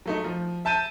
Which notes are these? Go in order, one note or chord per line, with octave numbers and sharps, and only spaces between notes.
F#3 A3 D#4
F3
E5 A5 G6 D#7